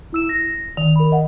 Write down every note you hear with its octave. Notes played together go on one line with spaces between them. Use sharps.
E4 E6 E7
A#6
D#3 F7
A#4 B5
D#5 F#5